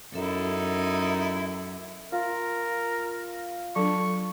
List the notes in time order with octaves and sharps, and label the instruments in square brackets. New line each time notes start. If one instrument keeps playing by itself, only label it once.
[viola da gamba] F#2 [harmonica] D#4 E4 [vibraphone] A4 E5
[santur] F4 [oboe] A#4
[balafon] F#3 D4 [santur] A4 [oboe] C#6